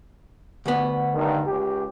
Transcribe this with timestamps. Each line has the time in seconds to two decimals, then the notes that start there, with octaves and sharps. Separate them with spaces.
0.66 D2 B3
1.15 G2 D#3 A#4
1.47 C#2 G4